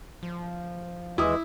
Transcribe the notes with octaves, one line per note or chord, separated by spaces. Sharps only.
F3
D#2 E3 G#3 E4 D6 D#6